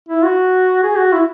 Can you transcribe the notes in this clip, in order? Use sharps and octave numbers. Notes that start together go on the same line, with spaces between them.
E4
F#4
G#4
F#4
E4